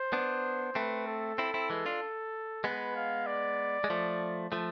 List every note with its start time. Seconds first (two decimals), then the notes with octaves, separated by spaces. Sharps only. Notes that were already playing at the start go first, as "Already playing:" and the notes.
Already playing: C5
0.13 B3 D4
0.75 A3 C4 B4
1.07 A4
1.38 C4 E4
1.54 C4 E4
1.70 E3 G#3
1.86 D4 F4
2.64 G#3 B3 B4
2.96 F5
3.26 D5
3.84 G#3
3.90 F3 A3
4.52 F3 A3